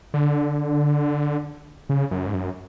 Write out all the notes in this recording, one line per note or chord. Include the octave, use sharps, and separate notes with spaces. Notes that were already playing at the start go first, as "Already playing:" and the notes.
D3
C#3
F#2
G#2
F#2